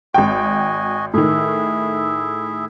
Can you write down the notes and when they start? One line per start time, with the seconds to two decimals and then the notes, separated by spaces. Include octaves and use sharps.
0.14 G#1 F#4 D#5 G5 G#5
1.14 A2 D#3 E4 G#4 E5